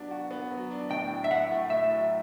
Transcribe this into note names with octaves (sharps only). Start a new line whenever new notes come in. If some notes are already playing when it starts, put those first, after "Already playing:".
Already playing: F#3 B3 D4
F#4
B3
F#3
D4
A2 G5
F#3
E5
A2 F#5
A3
A2 E5
F#3